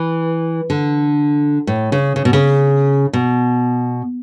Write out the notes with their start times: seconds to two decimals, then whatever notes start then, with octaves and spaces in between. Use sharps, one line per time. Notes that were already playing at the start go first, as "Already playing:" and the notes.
Already playing: E3
0.70 D3
1.67 A2
1.92 C#3
2.16 C#3
2.25 B2
2.33 C#3
3.13 B2